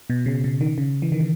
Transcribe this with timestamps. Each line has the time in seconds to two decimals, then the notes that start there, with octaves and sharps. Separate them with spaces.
0.10 B2
0.26 C#3
0.44 C#3
0.61 D#3
0.78 C#3
1.02 E3
1.12 D#3
1.20 C#3